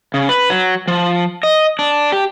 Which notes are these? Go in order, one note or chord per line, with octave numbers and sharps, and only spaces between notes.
C#3
B4
F#3
F3
D#5
D4
G4